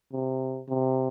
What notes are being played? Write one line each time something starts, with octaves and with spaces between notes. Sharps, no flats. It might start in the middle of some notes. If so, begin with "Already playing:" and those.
C3
C3